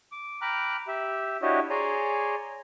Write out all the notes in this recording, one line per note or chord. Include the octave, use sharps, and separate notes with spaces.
D6
G5 A#5 B5 D6 F6 F#6
G4 E5
D4 E4 F#4 G4 C#5 D#5
G#4 C#5 D5 G#5 A#5 C6